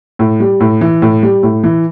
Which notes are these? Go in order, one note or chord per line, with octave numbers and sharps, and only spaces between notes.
A2
G3
A2
E3
A2
G3
A2
E3